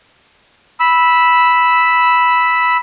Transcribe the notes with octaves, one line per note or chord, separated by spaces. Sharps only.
B5 E6